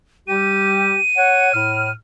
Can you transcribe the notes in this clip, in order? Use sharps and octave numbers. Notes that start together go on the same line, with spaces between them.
G3 G4 D#7
C#5 F#5
A2 F6